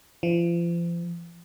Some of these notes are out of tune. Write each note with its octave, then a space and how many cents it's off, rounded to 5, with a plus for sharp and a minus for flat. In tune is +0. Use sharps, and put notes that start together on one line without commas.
F3 -40